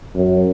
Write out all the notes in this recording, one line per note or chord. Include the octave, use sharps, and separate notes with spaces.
F#2